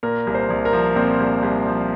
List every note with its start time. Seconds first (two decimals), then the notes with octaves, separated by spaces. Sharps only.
0.03 A#2 A#4
0.27 C2
0.35 C5
0.50 C2
0.65 A#4
0.73 F3
0.96 A#2 C4
1.20 C2
1.43 C2
1.67 F3